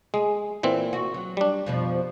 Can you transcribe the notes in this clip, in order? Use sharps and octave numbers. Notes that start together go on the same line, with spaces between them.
G#3 G#4
A#2 E3 C4
F#4
F#3
G3 D4
F2 B2 F3